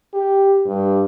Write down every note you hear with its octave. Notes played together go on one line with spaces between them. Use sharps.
G4
G2